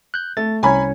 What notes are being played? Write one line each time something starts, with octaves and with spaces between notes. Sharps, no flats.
F#6 G6
A3 A6
C2 C#4 C#5 G#5 A#5 B5